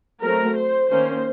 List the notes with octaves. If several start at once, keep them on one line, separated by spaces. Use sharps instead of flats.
F#3 A3 C4 A#4
C5
D#3 A#3 C#4 C5